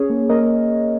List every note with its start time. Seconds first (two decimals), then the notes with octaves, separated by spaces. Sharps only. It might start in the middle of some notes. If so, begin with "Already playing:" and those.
Already playing: C#4 G#4 C#5
0.10 A#3
0.29 A#3 A#4 D#5